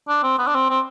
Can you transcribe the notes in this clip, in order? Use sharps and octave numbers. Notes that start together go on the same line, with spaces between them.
D4
C4
B3
D4
C4
C4